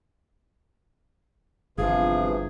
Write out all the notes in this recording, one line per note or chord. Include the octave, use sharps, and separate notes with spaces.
G1 C3 E3 F3 G#4 F5